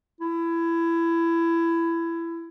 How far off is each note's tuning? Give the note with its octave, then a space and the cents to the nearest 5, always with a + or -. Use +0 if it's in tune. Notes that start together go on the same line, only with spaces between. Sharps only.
E4 +20